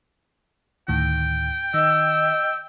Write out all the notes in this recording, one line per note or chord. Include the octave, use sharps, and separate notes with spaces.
D2 A2 D#3 G5
D#3 D#5 E6